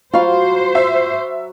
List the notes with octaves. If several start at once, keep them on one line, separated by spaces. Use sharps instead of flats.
F#3 F4 F#4 C5 F5 B5
E5